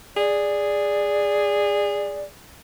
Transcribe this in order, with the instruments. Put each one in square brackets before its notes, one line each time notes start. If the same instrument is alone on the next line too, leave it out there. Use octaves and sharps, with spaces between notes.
[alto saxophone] G#4 [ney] D5